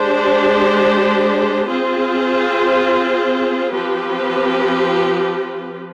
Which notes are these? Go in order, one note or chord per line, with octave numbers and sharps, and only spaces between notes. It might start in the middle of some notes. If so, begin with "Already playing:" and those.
Already playing: G#3 D4 G4 C5
C4 F4 G#4 C5
F3 C4 G4 B4